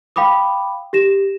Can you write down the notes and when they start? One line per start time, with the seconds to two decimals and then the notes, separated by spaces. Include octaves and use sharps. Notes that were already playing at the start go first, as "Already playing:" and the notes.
0.16 F5 G5 B5 D6 D#6
0.93 G4 A#6 E7